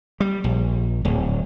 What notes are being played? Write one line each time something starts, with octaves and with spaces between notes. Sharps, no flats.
G3
A#1
D1